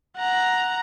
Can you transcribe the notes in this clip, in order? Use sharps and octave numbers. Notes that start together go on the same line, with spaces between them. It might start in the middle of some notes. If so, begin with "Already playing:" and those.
F#5 A#5